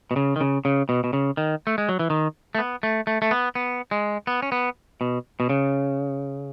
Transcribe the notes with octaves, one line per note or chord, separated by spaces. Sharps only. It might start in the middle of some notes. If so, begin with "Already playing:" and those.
B2
C#3
D#3
C#3
C#3
B2
B2
C#3
D#3
A3
G#3
F#3
E3
D#3
A3
B3
A3
A3
A3
B3
B3
G#3
B3
C#4
B3
B2
B2
C#3